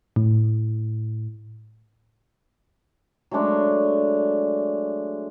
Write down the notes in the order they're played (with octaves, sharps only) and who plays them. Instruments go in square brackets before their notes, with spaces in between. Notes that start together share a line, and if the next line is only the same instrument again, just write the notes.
[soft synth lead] A2
[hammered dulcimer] F#3 G#3 A3 D4